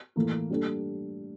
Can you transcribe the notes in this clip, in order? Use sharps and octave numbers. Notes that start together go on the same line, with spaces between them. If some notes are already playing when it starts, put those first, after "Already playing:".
A2 E3 A#3 E4 A4
G3 A#3 D4 A4